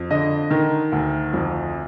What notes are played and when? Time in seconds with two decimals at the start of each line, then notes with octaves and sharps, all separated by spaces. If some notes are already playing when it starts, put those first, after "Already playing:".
Already playing: F2
0.10 D3 D#5
0.51 D#3
0.92 D2
1.33 F2